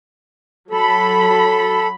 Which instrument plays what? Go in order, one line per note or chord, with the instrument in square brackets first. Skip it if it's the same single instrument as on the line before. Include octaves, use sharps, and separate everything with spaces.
[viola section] F#3 B5 [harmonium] A4